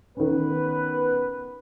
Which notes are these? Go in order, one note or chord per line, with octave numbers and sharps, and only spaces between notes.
D#3 B3 C#4 B4